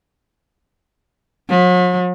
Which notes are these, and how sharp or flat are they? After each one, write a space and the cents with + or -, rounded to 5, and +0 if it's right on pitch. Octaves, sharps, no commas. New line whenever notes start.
F#3 -45